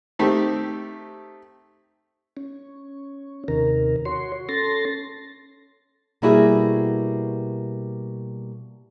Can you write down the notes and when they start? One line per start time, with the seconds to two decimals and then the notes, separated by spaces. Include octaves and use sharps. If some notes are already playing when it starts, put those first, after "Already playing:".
0.19 D#3 A3 C4 G4
2.37 C#4
3.48 D#2 C3 D#3 A#4
4.05 F#4 C#5 C6
4.49 C#4 A4 C6 A6 A#6
6.22 B2 G3 A#3 E4 F#4 G#4